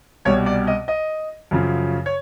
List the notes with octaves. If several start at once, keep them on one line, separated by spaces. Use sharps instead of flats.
C2 B2 G3 C#5
D5
D#5
D#5
F#2 C#3 F3
C#5